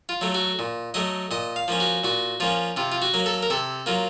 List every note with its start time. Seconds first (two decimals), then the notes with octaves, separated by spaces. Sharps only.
0.09 F4
0.21 F#3 A3
0.35 F#4
0.59 A#2
0.94 F#3 A3 D#5
1.31 A#2 D#5
1.56 F5
1.68 F3 A#3 C#4
1.80 F#4
2.04 A#2 F#4
2.40 F3 A#3 C#4 F4
2.76 C3 F4
2.92 F4
3.02 F#4
3.14 F#3 A#3
3.26 A4
3.43 A#4
3.50 C3 A4
3.86 F#3 A#3 F4